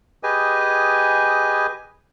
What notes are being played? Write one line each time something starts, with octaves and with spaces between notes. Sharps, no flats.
G4 G#4 B4 D#5 G#5